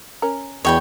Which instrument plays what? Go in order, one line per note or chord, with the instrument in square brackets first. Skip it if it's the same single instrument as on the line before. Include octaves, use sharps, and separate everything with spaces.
[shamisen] C#4 A#4
[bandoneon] E2 [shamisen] F#4 D#5 [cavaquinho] C#5 G5 B5